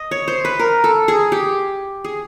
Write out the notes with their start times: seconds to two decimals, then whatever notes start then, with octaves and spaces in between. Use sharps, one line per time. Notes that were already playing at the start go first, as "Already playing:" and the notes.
Already playing: D#5
0.11 C#5
0.28 C5
0.45 B4
0.59 A#4
0.84 A4
1.08 G#4
1.32 G4
2.04 G#4